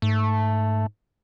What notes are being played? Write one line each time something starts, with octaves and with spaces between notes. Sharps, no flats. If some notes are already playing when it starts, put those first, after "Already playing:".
G#2 A3